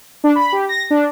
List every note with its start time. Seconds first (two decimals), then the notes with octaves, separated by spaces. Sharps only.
0.24 D4
0.36 B5
0.52 G4
0.69 A#6
0.91 D4